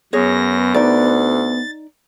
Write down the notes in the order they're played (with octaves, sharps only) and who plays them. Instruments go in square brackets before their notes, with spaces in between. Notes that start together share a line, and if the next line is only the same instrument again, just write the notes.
[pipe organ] F#2 A#6 [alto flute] B3 [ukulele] G#4 C#5
[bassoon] D2 [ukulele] D#4 D5 [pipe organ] A6